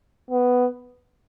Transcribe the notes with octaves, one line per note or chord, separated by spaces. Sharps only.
B3